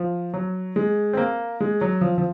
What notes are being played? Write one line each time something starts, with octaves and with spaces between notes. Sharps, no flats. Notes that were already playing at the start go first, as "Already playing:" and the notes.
Already playing: F3
F#3
G#3
C4
A#3
G#3
F#3
F3
F3